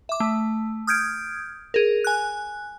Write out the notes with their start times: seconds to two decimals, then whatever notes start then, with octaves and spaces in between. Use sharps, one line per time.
0.09 E5 D6
0.20 A3
0.87 D#6 F6 G6 G#6 D7
1.74 G#4 A#4
2.04 G#5 F#6